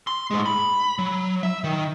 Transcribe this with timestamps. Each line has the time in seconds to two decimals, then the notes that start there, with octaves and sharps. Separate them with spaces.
0.07 C6
0.31 A2 G#3
0.46 B5
0.98 F#3
1.43 E5
1.64 D#3